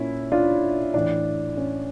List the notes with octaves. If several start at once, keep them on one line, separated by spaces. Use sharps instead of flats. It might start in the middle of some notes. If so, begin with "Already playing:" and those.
Already playing: A#2 C#4 E4
D4 F4
A2 E3 D4
C#4